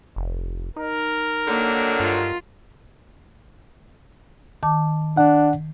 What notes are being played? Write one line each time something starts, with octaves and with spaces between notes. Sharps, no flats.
F1
D#4 A#4
D3 D#3 F#3 A#3
G2 F4
D#3 A5 D6
D4 F#5